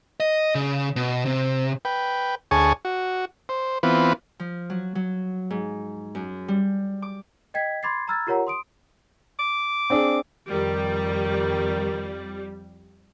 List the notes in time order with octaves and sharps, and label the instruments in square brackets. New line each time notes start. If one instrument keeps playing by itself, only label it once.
[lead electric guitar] D#5
C#3
B2
C3
[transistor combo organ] B4 G5
D2 G#4 C#5 G#5 A5 C#6
F#4
C5
E3 B3 C4 F4 B4
[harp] F3
F#3
F#3
G#2
F#2
G3
D6
[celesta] D#5 G5 G#6 B6
B5 C6 D6 G#6 A6 C7
A#5 B5 E6 F6 G#6 A6
F4 G4 A#4 C#5 F#5 A#5
C6 D#6 D7
[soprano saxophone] D6
[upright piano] C4 D4 G#4
[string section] F2 G3 [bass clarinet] D#3